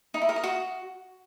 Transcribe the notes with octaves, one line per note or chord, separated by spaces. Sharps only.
D#4
E4
A#4
D#5
F#4